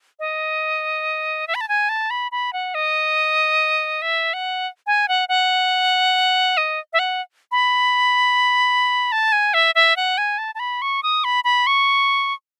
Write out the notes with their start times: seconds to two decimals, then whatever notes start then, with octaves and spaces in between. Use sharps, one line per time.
0.19 D#5
1.48 E5
1.55 B5
1.61 A5
1.69 G#5
1.89 A5
2.10 B5
2.32 B5
2.53 F#5
2.75 D#5
4.02 E5
4.33 F#5
4.87 G#5
5.08 F#5
5.29 F#5
6.57 D#5
6.93 E5
6.99 F#5
7.52 B5
9.12 A5
9.32 G#5
9.54 E5
9.75 E5
9.96 F#5
10.18 G#5
10.38 A5
10.55 A5
10.60 B5
10.82 C#6
11.03 D#6
11.24 B5
11.44 B5
11.67 C#6